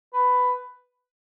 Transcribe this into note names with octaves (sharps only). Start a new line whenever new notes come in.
B4